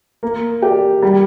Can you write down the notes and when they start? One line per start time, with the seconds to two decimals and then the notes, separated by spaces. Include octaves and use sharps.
0.23 A#3
0.62 G4 D5
1.02 G3